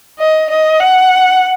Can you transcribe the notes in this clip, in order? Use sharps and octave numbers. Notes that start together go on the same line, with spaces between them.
D#5
D#5
F#5